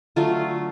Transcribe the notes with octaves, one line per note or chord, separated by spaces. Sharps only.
D3 F#3 A3 F4